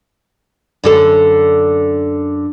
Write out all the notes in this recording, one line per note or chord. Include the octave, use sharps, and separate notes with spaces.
F#2 D3 A4